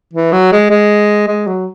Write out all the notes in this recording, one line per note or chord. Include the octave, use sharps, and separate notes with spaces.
E3
F#3
G#3
G#3
G#3
F#3